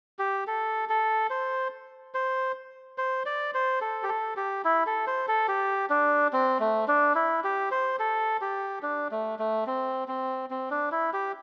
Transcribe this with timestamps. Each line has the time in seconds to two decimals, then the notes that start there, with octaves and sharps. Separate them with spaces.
0.19 G4
0.47 A4
0.89 A4
1.30 C5
2.14 C5
2.98 C5
3.26 D5
3.54 C5
3.81 A4
4.03 G4
4.09 A4
4.37 G4
4.65 E4
4.87 A4
5.07 C5
5.28 A4
5.48 G4
5.90 D4
6.33 C4
6.60 A3
6.88 D4
7.15 E4
7.44 G4
7.71 C5
7.99 A4
8.41 G4
8.83 D4
9.11 A3
9.39 A3
9.67 C4
10.08 C4
10.50 C4
10.71 D4
10.92 E4
11.13 G4